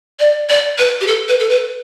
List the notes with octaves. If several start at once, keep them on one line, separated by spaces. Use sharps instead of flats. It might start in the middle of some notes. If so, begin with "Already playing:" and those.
D5
D5
B4
G4
A4
B4
A4
B4